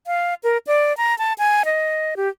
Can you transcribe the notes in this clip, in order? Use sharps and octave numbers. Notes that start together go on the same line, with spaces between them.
F5
A#4
D5
A#5
A5
G#5
D#5
G4